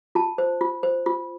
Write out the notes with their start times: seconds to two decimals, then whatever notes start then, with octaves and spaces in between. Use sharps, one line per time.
0.15 F4 A5
0.38 C5
0.61 F4
0.83 C5
1.06 F4